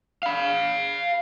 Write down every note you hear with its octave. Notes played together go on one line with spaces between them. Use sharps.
F5 B5